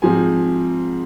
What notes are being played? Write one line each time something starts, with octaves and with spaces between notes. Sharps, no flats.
G#2 F3 C4 G#5